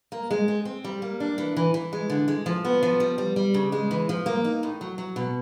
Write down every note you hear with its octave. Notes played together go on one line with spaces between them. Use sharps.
A#3
G#3
C4
C4
G3
A#3
D4
E3
E3
E3
G#3
D3
G#3
F3
B3
F3
G3
G3
G3
C#3
G#3
E3
F3
A#3
D#4
A2
F#3
F#3
B2